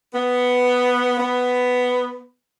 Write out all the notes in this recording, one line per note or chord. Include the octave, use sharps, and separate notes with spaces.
B3
B3